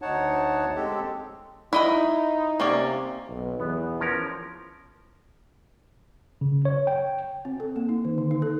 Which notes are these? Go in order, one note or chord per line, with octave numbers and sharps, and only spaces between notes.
D2 D#4 C#5 F#5 A5
G#3 C4 G4 A4
D#4 E4 D#5 B5
C3 A#3 C#4 D5
B1
E2 B3
F3 C#4 A#4
C#3
C#5
G5
C4
A4
A#3
D#4
D#3
D3
D#4
A4